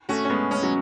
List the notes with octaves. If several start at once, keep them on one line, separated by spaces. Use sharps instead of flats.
A3 C#4 F#4
C#4
G#3 B3
G#3 C#4
F#3